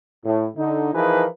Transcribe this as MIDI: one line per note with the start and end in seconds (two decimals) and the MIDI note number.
0.24 0.46 45
0.56 0.92 50
0.56 0.92 63
0.94 1.24 52
0.94 1.24 53
0.94 1.24 63
0.94 1.24 68
0.94 1.24 70
0.94 1.24 71